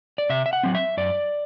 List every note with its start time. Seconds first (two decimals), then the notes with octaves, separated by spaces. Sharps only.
0.18 D5
0.30 C3 E5
0.46 E5
0.53 F#5
0.63 F#3 C4
0.75 E5
0.97 F#2 D5